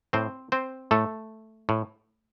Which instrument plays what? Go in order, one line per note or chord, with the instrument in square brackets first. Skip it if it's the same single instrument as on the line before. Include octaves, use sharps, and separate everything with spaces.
[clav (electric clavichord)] A2 C4 C5
C4 C5
A2 A3 A4
A2